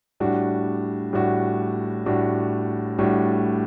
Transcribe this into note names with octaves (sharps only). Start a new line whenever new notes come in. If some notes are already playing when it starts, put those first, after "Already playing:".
A2 G3 D4 F#4
A2 G3 D4 F#4
A2 G3 D4 F#4
A2 G3 D4 F#4